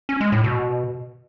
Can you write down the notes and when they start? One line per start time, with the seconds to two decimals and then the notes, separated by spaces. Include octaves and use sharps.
0.09 C#4
0.21 G#3
0.32 A2
0.44 B2